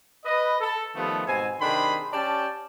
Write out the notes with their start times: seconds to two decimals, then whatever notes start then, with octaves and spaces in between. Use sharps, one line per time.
0.24 B4 D#5
0.60 A4
0.95 D#3 F3 G3 A3 B3
1.26 G#2 B2 C4 G#5
1.61 C3 D#3 D4 G#4 C5 B5
2.12 C#4 G4 D5 G5 A5